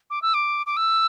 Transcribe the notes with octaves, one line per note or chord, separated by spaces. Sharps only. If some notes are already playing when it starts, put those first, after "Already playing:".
D6
E6
D6
D6
E6